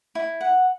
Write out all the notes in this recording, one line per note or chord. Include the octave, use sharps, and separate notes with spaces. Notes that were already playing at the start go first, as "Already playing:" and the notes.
E4
F#5